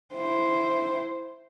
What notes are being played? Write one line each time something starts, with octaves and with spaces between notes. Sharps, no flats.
E4 C5